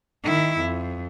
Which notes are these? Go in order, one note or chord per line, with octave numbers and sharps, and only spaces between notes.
D#3 E4
F2